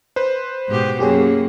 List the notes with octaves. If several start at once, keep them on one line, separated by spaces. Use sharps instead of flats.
B4 C5
G#2 B2 G4
F#2 A#3 G4 G#4 C#5